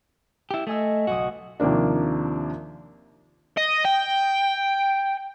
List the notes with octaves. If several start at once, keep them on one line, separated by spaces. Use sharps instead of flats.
E4 G4
A3 D#5 G#5 E6
F#1 B1 F#4 D#6
D#2 C3 F3 A#3 D4
D#5
G5